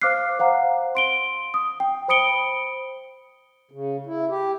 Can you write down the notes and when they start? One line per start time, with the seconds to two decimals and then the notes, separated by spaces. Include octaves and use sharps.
0.02 C5 F5 D6 F6 F#6 C7
0.39 C5 F5 F#5 A#5
0.95 C6 D7 G7
1.54 D#6
1.80 G5
2.08 C5 B5 D#6 C#7 D7 G7
3.71 C#3
4.06 E4
4.29 G4